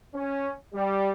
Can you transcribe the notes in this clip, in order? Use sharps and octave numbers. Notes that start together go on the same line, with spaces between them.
C#4
G3